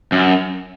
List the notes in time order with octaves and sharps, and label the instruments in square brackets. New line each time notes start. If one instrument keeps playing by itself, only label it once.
[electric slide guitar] F#2